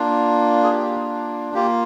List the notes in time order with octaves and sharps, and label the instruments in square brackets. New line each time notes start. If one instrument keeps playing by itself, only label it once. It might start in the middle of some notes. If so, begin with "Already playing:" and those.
Already playing: [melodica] A#3 D4 F4
G#4
G4
A#3 F4 G4